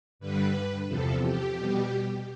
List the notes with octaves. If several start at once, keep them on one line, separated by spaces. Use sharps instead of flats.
G2 D3 G3 B4
E2 C3 F3 A4
G4
B2 G3